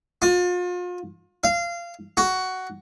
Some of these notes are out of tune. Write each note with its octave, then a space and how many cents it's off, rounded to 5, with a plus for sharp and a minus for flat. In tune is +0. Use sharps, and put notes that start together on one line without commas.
F4 +35
F5 -20
F#4 +10